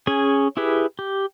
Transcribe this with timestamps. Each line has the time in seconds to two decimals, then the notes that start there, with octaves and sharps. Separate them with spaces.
0.07 C#4 G#4 G#5
0.57 E4 G4 G#4 B4
0.99 G4